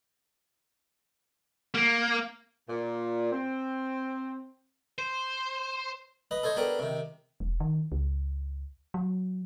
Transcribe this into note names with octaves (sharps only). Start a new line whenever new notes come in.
A#3
A#2
C4
C5
B4 D#5
A4 C5 C#5 D#5
B3 D4 G4 A4 A#4
C3 D#3
E1
D#3
C#2
F#3